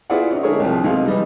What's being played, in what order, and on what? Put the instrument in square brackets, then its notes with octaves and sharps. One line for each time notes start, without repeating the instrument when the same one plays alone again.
[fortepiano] B3 E4 F4 G#4 D5 F#5
C#4 D#4
D3 G#3 A3 G#4 A#4 C#5
C2 C3 F3
B1 C3 D#3 G#3 F5
E3 G3 D#4